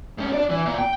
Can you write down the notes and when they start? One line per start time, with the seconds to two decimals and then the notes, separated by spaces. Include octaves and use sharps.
0.18 G#2 C#4
0.33 D4 D5
0.50 E3
0.65 A#2
0.78 G5